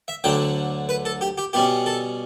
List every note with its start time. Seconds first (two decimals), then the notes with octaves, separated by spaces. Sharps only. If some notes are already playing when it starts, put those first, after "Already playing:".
0.08 E5
0.24 D2 D3 F#3 G5
0.89 B4
1.05 A4
1.21 G4
1.38 G4
1.53 B2 G3 C#4 G4
1.86 A4